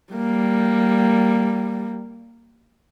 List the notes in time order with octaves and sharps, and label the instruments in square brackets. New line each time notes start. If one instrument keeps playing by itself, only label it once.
[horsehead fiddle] G3 A#3